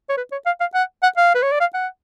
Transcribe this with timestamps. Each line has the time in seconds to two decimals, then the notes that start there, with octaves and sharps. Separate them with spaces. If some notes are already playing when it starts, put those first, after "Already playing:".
0.09 C#5
0.17 B4
0.32 C#5
0.46 F5
0.60 F5
0.74 F#5
1.03 F#5
1.17 F5
1.35 B4
1.43 C#5
1.52 D5
1.60 F5
1.74 F#5